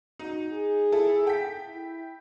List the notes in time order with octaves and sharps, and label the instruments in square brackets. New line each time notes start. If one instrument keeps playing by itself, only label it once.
[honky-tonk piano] D#4 [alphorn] F#4
[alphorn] G#4
[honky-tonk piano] E4 A4
G5 B6
[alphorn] E4